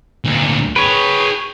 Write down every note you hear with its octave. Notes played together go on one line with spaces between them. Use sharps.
D2 A#2
G#4 B4 C#5 G5